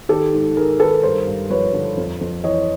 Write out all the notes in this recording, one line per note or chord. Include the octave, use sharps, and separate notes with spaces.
D#3 G4 A4
G#2
G#2 G#4 A#4
D#3 A4 B4
G2 A#4 C5
G2
F3 B4 C#5
D3
F2
F2
E3 C#5 D#5